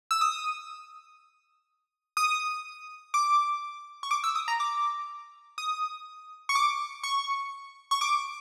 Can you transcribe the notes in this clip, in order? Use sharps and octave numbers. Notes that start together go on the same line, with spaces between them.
E6
D#6
D#6
D6
C#6
D6
E6
D#6
A#5
D6
D#6
C#6
D6
C#6
C#6
D6